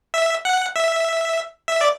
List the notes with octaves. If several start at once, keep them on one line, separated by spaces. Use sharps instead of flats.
E5
F#5
E5
E5
D5